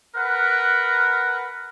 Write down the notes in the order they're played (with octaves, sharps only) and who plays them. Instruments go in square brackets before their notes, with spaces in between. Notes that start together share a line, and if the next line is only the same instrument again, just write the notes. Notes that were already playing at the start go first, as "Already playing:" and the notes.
[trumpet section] A#4 B4 F#5